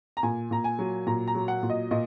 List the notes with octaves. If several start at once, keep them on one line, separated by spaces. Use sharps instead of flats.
A#5
A#2 G#5
A#2 A#5
G#5
F#3
A#2 A#5
A#5
F#3
F#5
A#2
D#5
A#2 D#5